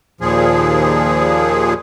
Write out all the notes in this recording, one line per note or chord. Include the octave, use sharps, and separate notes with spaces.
D#2 A#2 F3 G#4